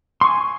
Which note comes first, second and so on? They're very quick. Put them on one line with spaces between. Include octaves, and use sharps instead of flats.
C6 C#6 G#5